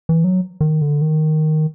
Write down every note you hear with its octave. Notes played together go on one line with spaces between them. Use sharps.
E3
F#3
D#3
D3
D#3